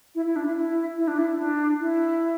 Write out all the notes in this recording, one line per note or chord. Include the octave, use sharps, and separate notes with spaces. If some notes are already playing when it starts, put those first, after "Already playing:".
E4
E4
D4
E4
E4
E4
D4
E4
D4
E4